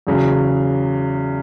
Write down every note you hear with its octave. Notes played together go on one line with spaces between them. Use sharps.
E2 C#3 F#3